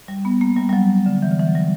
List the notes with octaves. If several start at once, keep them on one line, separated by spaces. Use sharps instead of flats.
G3
B3
A#3
G3
G3
F#3
D3
E3
D3
E3
F#3
G3